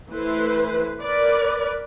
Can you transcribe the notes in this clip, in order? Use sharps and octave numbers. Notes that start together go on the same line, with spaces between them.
E3 A3 B4 C5
A#4 B4 D5